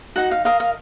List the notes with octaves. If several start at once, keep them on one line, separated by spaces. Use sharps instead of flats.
D#4 F#4 F#5
F5
A#4 D#5 F5
F5